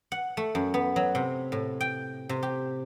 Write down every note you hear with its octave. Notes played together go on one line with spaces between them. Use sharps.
F#5
A3
F#2
B3
F#3
C3
A2
G5
C3
G4